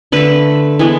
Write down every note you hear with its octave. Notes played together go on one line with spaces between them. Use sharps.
D3 A3 B4
E3 G#3 B3